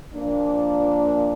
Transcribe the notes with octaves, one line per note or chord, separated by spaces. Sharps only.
A#2 F3 A#3 D4